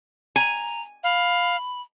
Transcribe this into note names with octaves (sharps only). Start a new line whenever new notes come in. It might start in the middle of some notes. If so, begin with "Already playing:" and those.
G#5 A#5
F5 B5